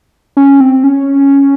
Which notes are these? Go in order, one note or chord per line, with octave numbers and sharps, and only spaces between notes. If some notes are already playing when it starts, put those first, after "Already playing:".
C#4
C4
C#4